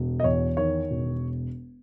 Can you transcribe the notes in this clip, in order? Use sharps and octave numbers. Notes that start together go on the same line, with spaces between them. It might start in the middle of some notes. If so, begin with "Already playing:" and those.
Already playing: E1
D#5
E2 C#5
D#3 C#5
E1